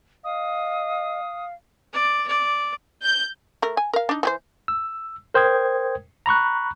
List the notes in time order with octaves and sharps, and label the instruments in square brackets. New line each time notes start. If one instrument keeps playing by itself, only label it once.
[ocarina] D#5 [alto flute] F5 [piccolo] D#6
[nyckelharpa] D5
D5
[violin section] G6
[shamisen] A3 A#4
G#5
A#4 F5
D4 D#4
E3 G4 C5
[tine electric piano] E6
A#4 C5 G5 D#6 G#6
A#5 B5 C#6 F#6